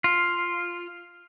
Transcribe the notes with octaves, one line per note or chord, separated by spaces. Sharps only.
F4